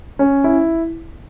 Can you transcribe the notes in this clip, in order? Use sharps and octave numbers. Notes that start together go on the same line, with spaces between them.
C#4
E4